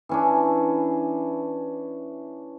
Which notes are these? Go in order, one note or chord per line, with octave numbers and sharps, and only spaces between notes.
E3 C#4 D4